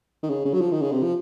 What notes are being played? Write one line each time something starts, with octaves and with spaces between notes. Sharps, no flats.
D#3
C#3
C#3
F#3
F3
D#3
C#3
C3
F3